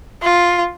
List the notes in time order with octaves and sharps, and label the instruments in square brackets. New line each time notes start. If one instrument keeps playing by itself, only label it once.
[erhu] F4